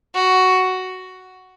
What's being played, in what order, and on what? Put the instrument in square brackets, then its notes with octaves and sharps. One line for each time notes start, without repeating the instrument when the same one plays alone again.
[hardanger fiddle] F#4